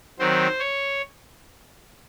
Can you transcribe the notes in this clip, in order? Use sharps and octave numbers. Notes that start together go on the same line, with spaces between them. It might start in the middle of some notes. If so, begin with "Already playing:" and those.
D#3 F#3 C4 C5
C#5